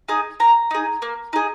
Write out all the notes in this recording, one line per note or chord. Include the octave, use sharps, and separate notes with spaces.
D#4 G#4
A#3 A#5
D#4 G#4
A#3
D#4 G#4